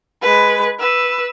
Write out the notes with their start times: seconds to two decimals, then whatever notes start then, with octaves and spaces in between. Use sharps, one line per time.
0.22 G#3 B4
0.79 B4 E6